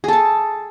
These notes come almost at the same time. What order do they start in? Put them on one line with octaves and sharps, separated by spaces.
G#4 A4 A5